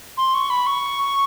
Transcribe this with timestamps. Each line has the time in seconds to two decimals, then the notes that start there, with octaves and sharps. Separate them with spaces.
0.17 C6
0.34 C#6
0.50 B5
0.67 C#6